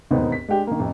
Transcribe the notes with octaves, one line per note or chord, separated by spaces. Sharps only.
E1 D#2 G#2 B3 C4 D#4
B6
G#3 D4 G4
D#3 A#3
A1 F2 C3